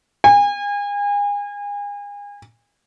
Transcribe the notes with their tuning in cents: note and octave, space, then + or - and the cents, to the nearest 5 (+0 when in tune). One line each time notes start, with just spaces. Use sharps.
G#5 -35